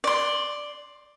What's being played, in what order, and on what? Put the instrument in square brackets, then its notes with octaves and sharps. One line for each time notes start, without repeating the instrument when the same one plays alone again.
[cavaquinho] D5 C6